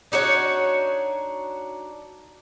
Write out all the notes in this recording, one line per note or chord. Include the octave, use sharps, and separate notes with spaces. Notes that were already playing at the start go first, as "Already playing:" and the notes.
D4 D#4 F#4 C#5